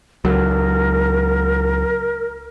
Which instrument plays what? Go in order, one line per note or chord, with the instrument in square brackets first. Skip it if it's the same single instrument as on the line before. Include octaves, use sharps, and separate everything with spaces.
[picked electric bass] C#2 F#3 [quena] A#4